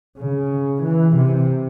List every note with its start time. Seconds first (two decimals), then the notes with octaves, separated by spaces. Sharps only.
0.19 C#3
0.83 E3
1.16 C3